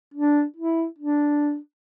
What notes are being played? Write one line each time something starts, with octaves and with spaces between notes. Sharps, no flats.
D4
E4
D4